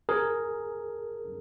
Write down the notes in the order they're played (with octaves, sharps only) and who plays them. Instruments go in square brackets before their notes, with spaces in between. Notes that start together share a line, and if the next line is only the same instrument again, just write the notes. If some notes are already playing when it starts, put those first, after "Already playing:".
[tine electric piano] G#4 A#4